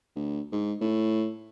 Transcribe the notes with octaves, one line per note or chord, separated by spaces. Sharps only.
D2
G#2
A2